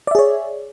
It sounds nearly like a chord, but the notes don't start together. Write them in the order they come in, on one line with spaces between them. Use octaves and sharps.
D5 E5 G#4 C#5